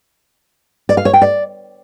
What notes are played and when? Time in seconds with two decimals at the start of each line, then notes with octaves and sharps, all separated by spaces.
0.89 D5
0.97 F5
1.05 C#5
1.13 G5
1.22 D5